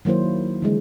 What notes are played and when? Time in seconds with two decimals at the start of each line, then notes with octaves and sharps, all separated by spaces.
0.05 D#3 F#3 A#3 E4 C5
0.62 D3 E3 G#3